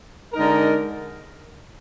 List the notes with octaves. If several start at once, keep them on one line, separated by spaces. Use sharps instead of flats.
D3 G#3 D#4 A#4